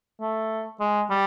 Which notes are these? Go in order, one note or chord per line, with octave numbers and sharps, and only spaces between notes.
A3
G#3
G3